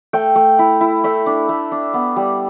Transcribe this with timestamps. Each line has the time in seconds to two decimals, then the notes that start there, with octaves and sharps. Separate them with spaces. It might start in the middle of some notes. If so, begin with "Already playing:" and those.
0.13 A3 G5
0.36 A3
0.59 E4
0.81 E4
1.04 A3 E5
1.26 D4
1.49 A3
1.72 D4
1.94 B3
2.16 G3